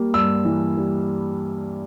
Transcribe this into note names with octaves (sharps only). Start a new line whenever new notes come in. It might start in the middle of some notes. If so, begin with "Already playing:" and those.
Already playing: G3 A#3
G2 E6
E3
G3